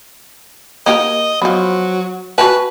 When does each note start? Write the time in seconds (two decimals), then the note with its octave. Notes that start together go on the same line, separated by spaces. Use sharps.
0.86 A#3 D#4 G4 D#5
1.42 F3 F#3 B3
2.38 F#4 B4 G#5 A5